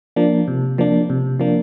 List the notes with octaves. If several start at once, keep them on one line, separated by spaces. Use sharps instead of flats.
F3 A#3 D4
C3
F3 A#3 D4
C3
F3 A#3 D4